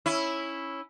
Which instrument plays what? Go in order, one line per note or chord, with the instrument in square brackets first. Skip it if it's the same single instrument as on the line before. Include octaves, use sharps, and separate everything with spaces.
[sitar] C#4 E4